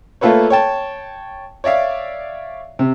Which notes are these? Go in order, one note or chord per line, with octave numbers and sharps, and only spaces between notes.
A3 A#3 F4 A4 B4 C#5
C#5 G5 A5
C#5 D5 E5 F5
C3